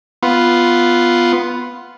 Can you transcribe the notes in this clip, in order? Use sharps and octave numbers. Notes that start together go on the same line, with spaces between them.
B3 F4